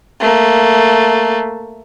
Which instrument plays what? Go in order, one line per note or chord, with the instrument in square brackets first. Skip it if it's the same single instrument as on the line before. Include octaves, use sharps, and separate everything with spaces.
[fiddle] A3 A#3